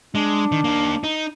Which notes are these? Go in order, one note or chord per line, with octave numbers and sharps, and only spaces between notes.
G#3 D4
D#3
A#3 D#4
D#4